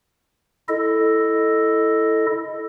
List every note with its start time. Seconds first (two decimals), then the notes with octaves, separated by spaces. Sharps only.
0.68 E4 A4 D#5